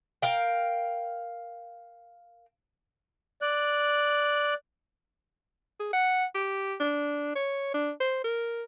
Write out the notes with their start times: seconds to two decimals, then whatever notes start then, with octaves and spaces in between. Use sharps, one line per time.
0.22 A#4 F5 G5
3.42 D5 F#6
5.80 G#4
5.93 F#5
6.35 G4
6.80 D4
7.35 C#5
7.74 D4
8.00 C5
8.24 A#4